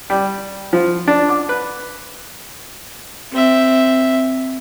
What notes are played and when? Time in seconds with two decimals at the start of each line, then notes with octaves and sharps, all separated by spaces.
0.10 G3
0.73 F3
1.08 D4
1.29 D6
1.49 B4
3.32 C4 E5